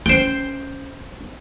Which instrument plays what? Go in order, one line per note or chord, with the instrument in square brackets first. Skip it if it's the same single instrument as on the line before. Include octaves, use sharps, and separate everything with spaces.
[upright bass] C#4 [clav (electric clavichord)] C5 G5